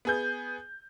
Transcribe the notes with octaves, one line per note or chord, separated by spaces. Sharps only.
B3 G#4 G6